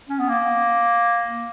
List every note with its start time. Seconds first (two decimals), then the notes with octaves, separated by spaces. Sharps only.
0.09 C#4
0.19 B3
0.29 A#3